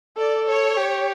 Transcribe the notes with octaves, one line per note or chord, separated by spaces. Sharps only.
A4 D5
C#5
G4